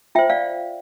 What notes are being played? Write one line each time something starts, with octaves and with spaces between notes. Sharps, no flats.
F4 C5 E5 G5
D5 F5